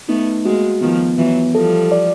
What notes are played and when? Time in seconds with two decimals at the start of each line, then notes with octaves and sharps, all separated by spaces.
0.08 A3 B3 D#4
0.45 G#3 A#3 F#4
0.81 D#3 F3 B3
1.18 E3 F#3 B3
1.54 F3 G3 A4
1.92 D5